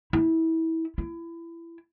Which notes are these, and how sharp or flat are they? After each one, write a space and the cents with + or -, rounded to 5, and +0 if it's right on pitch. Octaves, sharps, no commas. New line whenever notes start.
E4 -25
E4 +25